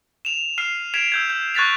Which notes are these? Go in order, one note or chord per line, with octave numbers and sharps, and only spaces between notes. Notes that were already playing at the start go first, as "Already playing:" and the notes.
E7 F7
F6 C7 D#7 E7
G#6 B6 D7 E7 F7
E6 G6 G#6
G6
C#6 F#6 G#6 A6 B6 F7